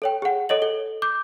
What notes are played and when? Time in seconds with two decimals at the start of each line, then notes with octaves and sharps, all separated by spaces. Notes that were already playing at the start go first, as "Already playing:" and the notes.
0.02 A4 C#5 G5
0.22 G#4 F#5
0.49 A4 C#5 D#5 F#7
0.62 A4 G7
1.02 D6 G6